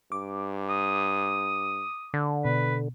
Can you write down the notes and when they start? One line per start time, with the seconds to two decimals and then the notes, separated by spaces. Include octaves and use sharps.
0.12 G2 D6
0.70 D#6
2.14 D3
2.45 B2 B4